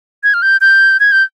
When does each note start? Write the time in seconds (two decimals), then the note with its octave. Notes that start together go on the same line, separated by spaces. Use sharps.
0.24 G#6
0.34 F6
0.42 G6
0.61 G6
1.00 G#6
1.12 G6